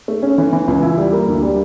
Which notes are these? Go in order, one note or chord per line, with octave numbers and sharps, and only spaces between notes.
A3
C#4
E3
E3
C#2
E4
G3
A#3
D2
G3